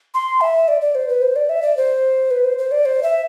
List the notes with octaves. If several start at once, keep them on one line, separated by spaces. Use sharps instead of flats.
C6
E5
D5
D5
C5
B4
C5
D5
E5
D5
C5
B4
C5
C5
D5
C5
E5